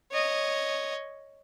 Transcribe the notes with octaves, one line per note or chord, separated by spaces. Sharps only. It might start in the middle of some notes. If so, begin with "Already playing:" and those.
C#5 D#5